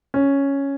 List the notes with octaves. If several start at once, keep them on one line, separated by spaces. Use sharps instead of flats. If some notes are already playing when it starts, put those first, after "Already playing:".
C#4